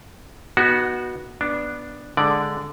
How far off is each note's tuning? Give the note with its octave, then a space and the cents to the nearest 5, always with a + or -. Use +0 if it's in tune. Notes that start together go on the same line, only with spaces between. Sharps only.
B3 -25 D#4 -10 F#4 +0
B3 -10 D4 +0
D3 +0 G#3 +10 D5 +0